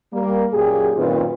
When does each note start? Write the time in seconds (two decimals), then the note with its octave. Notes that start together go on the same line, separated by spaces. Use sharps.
0.12 G3 A#3
0.52 F#2 A#2 G4 G#4
0.96 F#2 A#2 D#3 C4 F4 B4